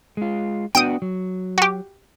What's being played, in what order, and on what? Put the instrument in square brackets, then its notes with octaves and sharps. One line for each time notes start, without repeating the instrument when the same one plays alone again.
[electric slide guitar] G#3 F4
[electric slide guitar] B3 D4 F#4 [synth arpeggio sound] G5 D#6
[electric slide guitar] F#3
[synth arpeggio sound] F#4 G4